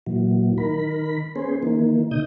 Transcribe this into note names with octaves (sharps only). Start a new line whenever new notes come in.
A#2 E3 F#3
D#3 A#4 B5
B3 C#4 G#4 C5
D#3 E3 A#3
B2 D3 D#4 D#6 G6